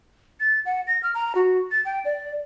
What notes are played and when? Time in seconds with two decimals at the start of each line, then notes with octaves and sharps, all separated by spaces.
0.40 A6
0.65 F#5
0.87 A#6
1.03 F6
1.14 A#5
1.35 F#4
1.71 A6
1.85 G5
2.05 D5